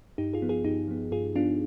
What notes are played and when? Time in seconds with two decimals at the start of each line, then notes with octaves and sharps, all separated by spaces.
0.18 G2 D#4 G4
0.33 F4 G#4
0.42 F3 B3
0.49 F4 G#4
0.65 G2 D#4 G4
0.88 F3 B3
1.11 G2 F4 G#4
1.35 F3 B3 D4 F4